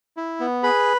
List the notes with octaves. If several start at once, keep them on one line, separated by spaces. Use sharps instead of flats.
E4
B3
G#4 B4 B5